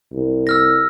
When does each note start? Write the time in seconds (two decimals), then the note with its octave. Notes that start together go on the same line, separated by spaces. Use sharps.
0.13 C2
0.47 E6 F6 A#6